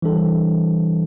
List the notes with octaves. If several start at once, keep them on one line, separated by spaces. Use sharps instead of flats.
E3 G3 D4 A4